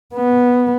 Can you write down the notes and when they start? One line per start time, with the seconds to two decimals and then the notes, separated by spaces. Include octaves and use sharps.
0.15 B3